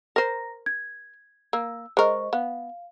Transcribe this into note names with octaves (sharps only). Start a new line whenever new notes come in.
A#4 C5 A#5 A#6
G#6
A#3 E6
G#3 A#4 C5 D#5 C#6
B3 F5